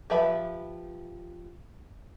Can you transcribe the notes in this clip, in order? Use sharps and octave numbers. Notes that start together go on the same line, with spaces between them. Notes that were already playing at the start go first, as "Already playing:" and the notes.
F3 G4 B4 E5 B5